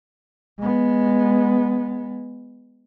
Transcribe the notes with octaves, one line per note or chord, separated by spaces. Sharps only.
G#3 B3